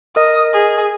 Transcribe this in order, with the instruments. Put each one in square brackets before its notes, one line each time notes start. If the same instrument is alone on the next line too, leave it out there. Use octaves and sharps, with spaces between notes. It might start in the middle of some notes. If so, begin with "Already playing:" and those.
[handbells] A#4 D#5 [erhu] D#6
[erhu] G#4